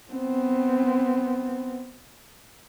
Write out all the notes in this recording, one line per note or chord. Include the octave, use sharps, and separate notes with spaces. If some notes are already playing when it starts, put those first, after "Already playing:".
B3 C4